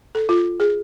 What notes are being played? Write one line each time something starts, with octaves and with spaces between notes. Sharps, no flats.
A4
F4
G#4